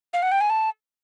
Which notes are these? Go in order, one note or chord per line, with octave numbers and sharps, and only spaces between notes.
F5
F#5
G5
G#5
A5